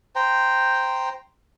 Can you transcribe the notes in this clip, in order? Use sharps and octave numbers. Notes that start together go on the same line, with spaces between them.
C5 G5 A#5